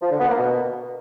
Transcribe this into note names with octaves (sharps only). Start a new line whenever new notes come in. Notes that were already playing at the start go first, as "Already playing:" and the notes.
F3
D3
B3
A#3
B2